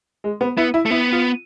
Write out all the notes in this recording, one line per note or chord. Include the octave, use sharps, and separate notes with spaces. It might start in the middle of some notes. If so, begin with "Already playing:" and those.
G#3
B3
B3 E4
E4
A3
B3 E4
F4